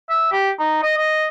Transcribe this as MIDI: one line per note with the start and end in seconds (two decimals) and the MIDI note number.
0.10 0.30 76
0.32 0.50 67
0.60 0.79 63
0.83 0.94 75
0.98 1.27 75